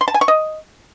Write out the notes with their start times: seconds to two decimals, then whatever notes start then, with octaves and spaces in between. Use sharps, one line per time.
0.01 C6
0.08 A5
0.14 G#5
0.21 C#6
0.28 D#5